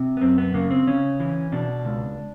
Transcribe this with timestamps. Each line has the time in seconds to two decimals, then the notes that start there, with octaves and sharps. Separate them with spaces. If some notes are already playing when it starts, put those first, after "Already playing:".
Already playing: C3
0.17 B3
0.21 F#2 C4
0.38 B3
0.54 C#3 A#3
0.70 C4
0.87 C#3 C#4
1.20 E3
1.52 B2 D4
1.85 C#2